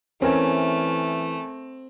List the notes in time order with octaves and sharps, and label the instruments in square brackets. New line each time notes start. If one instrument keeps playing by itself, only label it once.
[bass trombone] E3 [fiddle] A3 [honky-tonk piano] C4 [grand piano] C#4 A#4 G#5